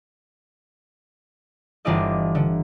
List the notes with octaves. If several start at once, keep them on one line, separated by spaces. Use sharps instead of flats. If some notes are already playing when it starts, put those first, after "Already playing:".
G1 E3 D4 F4 D5 D#5
D3